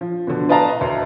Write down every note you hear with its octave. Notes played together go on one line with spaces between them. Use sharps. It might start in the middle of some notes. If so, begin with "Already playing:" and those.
F3
B2 D3
B4 D5 D#5 F5 A5 A#5
D2